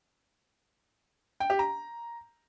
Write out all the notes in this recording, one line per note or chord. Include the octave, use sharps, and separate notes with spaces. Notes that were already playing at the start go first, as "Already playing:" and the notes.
G5
G4
A#5